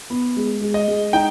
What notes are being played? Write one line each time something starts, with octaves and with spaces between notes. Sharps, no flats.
B3
G#3
G#3
D#5
G#3
D#4 G5